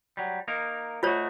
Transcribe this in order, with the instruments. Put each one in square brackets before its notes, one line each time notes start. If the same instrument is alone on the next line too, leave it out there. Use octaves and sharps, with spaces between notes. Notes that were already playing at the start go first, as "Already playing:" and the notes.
[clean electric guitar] F#3 G3
A#3 D#4 A#4
[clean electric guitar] A3 D#4 F#4 [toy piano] F4 C5 C#5